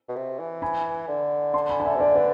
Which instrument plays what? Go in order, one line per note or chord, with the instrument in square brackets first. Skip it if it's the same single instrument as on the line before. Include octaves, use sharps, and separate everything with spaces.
[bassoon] B2
C3
E3
[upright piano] G#5 B5
[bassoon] D3
[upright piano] A5 C6
G#5 B5
A5
E5 G#5
[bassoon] C3
[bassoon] D3 [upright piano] D5 F5
[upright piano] B4 D5